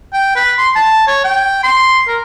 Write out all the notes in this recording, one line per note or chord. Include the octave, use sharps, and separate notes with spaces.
G5
B4
C6
A5
C#5
G5
C6
A#4